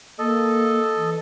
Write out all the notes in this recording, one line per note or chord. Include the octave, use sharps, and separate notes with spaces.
A#3 A4 D#5
E3